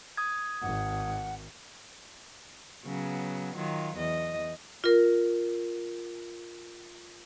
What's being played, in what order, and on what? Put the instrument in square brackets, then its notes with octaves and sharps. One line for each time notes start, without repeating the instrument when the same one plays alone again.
[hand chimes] D#6 G#6
[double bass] G#1 G#2 [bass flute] F#5
[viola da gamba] C#3 F#3 B3
D#3 F#3 F4
E2 D#5
[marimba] F4 A#4